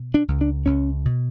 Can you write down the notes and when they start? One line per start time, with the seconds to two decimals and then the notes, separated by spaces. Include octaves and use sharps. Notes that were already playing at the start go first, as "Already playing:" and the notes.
Already playing: B2
0.14 D4
0.28 C#2
0.41 D4
0.66 C#2 C#4
1.05 B2